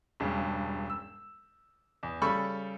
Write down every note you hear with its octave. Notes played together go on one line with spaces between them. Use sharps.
E1 G2 C#3
E6
E2
C#3 G3 A4 B5 C#6